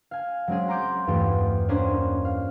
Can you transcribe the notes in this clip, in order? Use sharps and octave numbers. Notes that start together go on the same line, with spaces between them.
F5 G#5
F#3 G#3 C4 C#4 G#4
F#5 A#5 C6 D6 G6
E2 G2 A3 F4 G4 A4
A#3 C#4 D4 G4 C5
F5